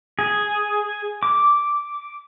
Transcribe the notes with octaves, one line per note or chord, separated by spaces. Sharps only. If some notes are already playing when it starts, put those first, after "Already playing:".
G#4
D6